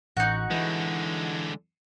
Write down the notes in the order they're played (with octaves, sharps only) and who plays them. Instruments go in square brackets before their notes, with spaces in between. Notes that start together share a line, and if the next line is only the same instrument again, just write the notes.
[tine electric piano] A1 [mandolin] D#4 F#4
[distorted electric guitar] D3 G#3 [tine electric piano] E3 E4